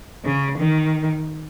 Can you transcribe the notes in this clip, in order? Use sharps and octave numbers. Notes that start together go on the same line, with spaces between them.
C#3
D#3